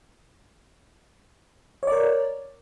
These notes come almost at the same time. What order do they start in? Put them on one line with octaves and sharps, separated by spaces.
C#5 D5 A#4